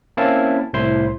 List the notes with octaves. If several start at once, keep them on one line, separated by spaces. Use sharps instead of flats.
A#3 C4 C#4 E4 F5 A5
C2 A2 E4 C5 C6